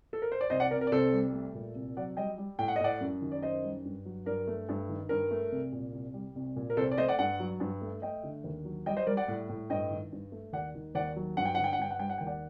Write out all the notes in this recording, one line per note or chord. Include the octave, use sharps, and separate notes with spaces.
A4
A#4
C5
D5
C2 C5 D#5
D5 F#5
C3 A#4 D5
A#4
D5
C2 A4 C5
G3
A3
A#2
C2
F#3 D5 F#5
G3 D#5 G5
G3
A2 G5
F#5
D#5
A2 D5 F#5
F#2
D#3
D5
F#2 C5 D#5
G3
G2
F#3
G2 A#4 D5
A3
G2
D#3
G2 A#4
A3
C2
A#2
C2
G3
C2
A#2
A#4
C2 A4 C5
D5
A3 C5 D#5
D5 F#5
G2 D5 F#5
F#3
G2
A3
A3 D#5 G5
D3
D#2
F#3
G3 D#5 G5
C5 D#5
G3 A#4 D5
D5 F#5
A2
A2
G2 D#5 G5
D#3
G2
A3
D#2 D5 F#5
D#3
D#2 D5 F#5
F#3
G2 F#5
G5
D3 F#5
G5
F#5
G2 G5
F#5
G3 G5
F#5
D#2 G5
D5 F#5